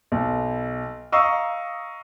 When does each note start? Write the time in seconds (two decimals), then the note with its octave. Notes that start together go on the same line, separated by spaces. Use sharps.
0.12 B1
1.12 D#5 F5 A#5 C#6 D#6 E6